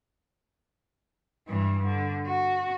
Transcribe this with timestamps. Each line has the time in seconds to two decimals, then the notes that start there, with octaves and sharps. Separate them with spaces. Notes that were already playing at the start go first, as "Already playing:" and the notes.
1.48 G2 E3
1.85 D3
2.27 F#4